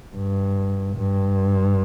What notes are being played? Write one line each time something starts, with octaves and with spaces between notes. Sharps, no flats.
G2
G2